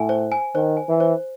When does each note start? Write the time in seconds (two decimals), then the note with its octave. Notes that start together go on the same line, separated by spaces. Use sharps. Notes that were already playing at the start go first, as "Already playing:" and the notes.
Already playing: A2 G#5
0.09 C5
0.32 G#5
0.55 D#3 C5
0.77 G#5
0.89 E3
1.00 C5